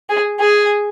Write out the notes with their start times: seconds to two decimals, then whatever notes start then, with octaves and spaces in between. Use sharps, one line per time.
0.09 G#4
0.39 G#4